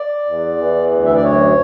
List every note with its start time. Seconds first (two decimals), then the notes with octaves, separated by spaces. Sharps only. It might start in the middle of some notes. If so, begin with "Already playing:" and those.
Already playing: D5
0.26 E2
0.58 E3
0.91 D2
1.05 E5
1.15 D5
1.24 F#2 C#5